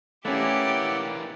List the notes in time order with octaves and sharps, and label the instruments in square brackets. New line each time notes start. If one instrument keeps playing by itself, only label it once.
[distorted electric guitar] E3 A#3 [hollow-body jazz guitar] A3 C#4 [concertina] E4 D5 F#5 [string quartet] G4